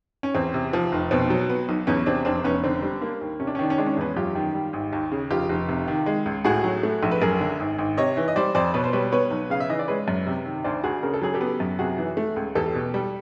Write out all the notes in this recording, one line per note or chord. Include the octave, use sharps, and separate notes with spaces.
C#4
E2 C4
C3
F3
F1
B2 C4
F#3
B3
B1
E2 B3 C#4
C3 C4 D4
F1 C4 D4
F1 B3 C#4
D3 C4
G3
A#3
D#2
C3 C#4
D4
C#4
D#3 D4
C#4
G#3 D4
C#4
D4
E2 B3 C#4
F#2 F4 G4
D#3
G3
G#1
D#2
C#3
F1 F4 G4
F1
C3
D#3
G#3
C#2
A2 F#4 G#4
F#3
A3
A#1
B4
F#2 G#4 A#4
D3
G#1
G#1
C3 C#5 D#5
E3
D#5
G3 C5 D5
F2 C5 D5
B2 B4 C#5
C5
G3 B4 C#5
B3 B4 C#5
B1
C#3 F5
E5
E3 D#5
D5
G#3 B4 C#5
F#2
C3
D#3
D2 C5 D5
D2 F#4 G#4
C#3 A#4
A4
F#3 G#4
G4 A4
B3
F#2
C3 F#4 G#4
E3
A3
C#2
E2 G4 A4
B2
G3